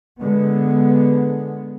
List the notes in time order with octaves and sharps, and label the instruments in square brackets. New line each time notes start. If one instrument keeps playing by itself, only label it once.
[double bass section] D3 G#3 B3